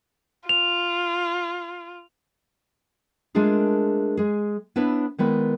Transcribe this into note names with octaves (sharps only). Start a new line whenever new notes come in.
F4 F7
G#3 A3 D4 F4 G#4 A#4
G#3 G#4
B3 D4 E4 B4 C#5 E5
D#3 G#3 B3 E4 B4 D5